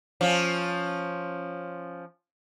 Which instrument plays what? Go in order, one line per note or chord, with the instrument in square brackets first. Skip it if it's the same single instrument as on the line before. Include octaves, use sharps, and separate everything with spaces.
[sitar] F3 C#4